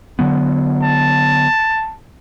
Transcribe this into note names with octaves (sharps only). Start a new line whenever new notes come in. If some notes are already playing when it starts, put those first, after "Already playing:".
D3 F#3 B3
A5